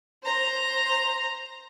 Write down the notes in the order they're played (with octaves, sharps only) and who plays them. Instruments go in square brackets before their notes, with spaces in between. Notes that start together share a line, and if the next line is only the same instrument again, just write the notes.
[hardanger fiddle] C5 A#5